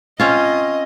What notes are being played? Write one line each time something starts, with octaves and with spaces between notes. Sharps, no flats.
C4 C#4 F4 D#5